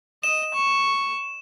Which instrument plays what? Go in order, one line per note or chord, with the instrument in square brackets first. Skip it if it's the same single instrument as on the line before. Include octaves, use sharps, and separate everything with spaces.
[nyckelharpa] D#5 [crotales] E7
[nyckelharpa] C#6